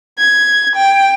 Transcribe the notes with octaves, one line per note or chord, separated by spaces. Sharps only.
G#6
G5